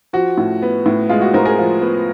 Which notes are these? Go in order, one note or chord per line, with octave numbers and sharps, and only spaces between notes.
F3 F#4
A2
B3
A2
G#3 F4
F#4
A2 A#4 C5
G#4 A#4
F3 F4
B3